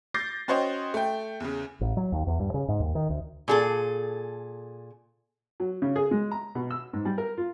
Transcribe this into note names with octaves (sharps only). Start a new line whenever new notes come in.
D6 G6 A6 A#6 C7
C#4 F#4 C5 C#5 D#5 G5
A3 G5
E2 C#3
A1
F#3
D#2
E2
G2
C#3
G#2
D#2
D#3
D2
A#2 G#4 A4
F#3
C#3
G#4
G#3
A#5
B2
E6
G#2
G3
A#4
F4